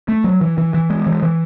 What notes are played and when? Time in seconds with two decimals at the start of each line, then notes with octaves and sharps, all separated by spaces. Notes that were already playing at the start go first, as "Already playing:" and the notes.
0.08 A3
0.24 F#3
0.41 E3
0.58 E3
0.74 E3
0.90 G#3
1.07 E3
1.23 E3